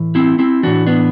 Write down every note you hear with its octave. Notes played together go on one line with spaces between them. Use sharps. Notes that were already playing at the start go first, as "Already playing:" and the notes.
Already playing: A2 E3
C4 E4
C4 E4
A2 E3 D4 F#4
B3 D4